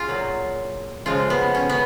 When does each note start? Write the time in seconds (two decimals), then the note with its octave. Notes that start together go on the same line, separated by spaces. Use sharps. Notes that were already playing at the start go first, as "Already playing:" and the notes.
Already playing: F4 G#4
0.08 A#2 F#3
1.06 C#3 F3 G#3 F4
1.30 B3
1.55 C#4
1.69 B3